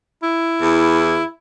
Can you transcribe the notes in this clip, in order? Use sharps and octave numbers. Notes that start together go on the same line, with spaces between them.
E4
E2